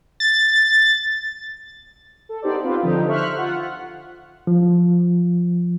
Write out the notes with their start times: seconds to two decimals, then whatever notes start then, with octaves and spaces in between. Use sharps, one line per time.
0.20 A6
2.29 A4
2.42 B3 D#4 G4 C5 D5
2.64 C4 F4 B4
2.81 D3 F3 D#4 G4
3.07 C5 E5 C#6 F6 F#6
3.37 F4 F#5
4.47 F3